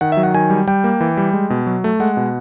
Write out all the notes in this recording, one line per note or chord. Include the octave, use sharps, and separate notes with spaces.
D#3 F#5
E5
F#3
F#5
D#3 G#5
G3
G3 G5
A#3
E3
G3
G#3
B2
F#3
A3
G#3 F#5
B2